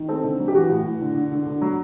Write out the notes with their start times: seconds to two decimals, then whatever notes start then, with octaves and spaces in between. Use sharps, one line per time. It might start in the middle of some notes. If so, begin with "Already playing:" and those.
Already playing: D#3
0.09 C4 A4
0.24 D3
0.39 F#3
0.48 G4
0.54 E3 F#4
0.70 A2
0.85 A2
1.01 D3
1.16 D3
1.32 D3
1.46 D3
1.62 F#3